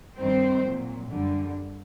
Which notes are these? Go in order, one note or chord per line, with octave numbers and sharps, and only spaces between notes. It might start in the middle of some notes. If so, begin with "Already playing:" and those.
G2 D#3 G3 C4 C5
A#2 F#3
F#2 D3 G3